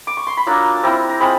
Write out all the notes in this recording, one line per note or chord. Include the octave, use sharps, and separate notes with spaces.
D6
C#6
C6
B5
F#3 A#3 D4 F4 A#5
A5
G3 C4 E4 A#5
A#5
G#3 C4 F4 B5